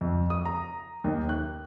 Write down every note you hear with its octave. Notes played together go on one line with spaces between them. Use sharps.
F2
D#6
A#5
D#2
F#6